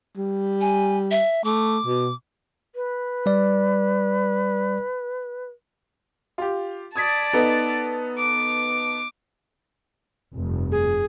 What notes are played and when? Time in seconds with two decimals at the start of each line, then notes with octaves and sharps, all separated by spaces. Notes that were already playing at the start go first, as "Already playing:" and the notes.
0.17 G3
0.61 G#5
1.11 E5
1.44 A3 D6
1.86 B2
2.75 B4
3.26 G3 D5
6.38 F4 G4
6.96 D5 A5 D#6 G#6 B6
7.33 B3 D#4 A4
8.18 D6
10.34 F1 G2
10.72 G#4